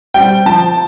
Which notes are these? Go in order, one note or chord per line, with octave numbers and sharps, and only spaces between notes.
G3 C4 G5
F3 A5